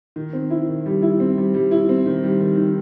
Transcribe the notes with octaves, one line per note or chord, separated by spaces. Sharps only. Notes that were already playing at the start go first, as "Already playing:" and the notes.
D#3
C4
E4
D#3
G3
E4
C4
G3
G3
E4
C4
D#3
G3
D#3
D#3